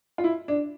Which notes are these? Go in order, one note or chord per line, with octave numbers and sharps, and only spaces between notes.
F4
E4
D4